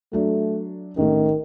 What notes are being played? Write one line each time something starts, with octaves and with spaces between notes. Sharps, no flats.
F#3 A3 D4
A1 D#3 A3